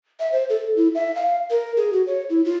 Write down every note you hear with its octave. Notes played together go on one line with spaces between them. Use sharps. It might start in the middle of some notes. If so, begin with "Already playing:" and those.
E5
C5
A4
E4
E5
F5
A#4
G#4
F#4
C#5
E4
F4